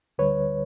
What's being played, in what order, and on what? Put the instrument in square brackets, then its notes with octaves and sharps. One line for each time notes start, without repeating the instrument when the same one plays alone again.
[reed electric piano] D2 D3 G3 B4 C#5